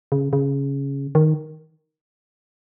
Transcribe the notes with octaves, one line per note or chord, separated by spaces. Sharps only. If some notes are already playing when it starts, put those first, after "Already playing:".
C#3
C#3
D#3